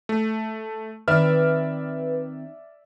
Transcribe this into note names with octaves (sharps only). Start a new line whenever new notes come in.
A3
D#3 C4 B4 D5 E5 F6